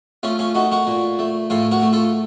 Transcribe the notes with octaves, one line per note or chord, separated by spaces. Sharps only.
A3 C#4 F4
C#4 F4
A3 D#4 F#4
F#4 A#4
A#2
A3
A2 F4 A4
F#4 A#4
A3
F4 A4